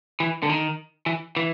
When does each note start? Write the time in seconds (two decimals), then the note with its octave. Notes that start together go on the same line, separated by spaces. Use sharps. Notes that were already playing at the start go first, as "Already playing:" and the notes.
0.20 E3
0.43 D3
0.49 D#3
1.06 E3
1.37 E3